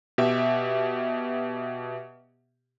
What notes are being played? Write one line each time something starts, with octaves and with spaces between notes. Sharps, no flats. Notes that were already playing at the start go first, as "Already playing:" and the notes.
B2 G4 E5